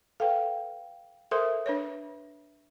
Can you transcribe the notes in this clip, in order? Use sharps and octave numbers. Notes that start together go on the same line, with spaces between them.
A4 B4 F5 G5
A4 A#4 C5 E5 C6 D#6
D4 B4 C#5